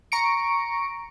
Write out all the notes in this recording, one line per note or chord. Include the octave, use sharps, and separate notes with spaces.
A#5 C#6 C#7 D7